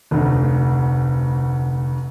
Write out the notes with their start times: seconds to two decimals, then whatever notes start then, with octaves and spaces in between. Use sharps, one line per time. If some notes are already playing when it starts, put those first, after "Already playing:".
0.11 F1 D2